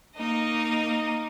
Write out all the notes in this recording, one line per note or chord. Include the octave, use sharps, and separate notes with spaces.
A#3 D#4 D#5